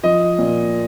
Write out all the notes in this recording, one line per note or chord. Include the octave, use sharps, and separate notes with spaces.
F3 D#5
A#2